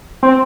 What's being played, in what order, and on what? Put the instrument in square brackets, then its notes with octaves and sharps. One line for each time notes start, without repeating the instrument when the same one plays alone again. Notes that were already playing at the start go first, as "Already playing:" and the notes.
[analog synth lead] C4